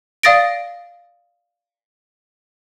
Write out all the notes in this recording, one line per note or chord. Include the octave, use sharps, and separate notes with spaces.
D5 F5 D#6 A6 A#6 D7